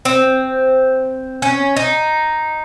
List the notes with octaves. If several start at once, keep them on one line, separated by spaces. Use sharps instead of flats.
C4
C#4
D#4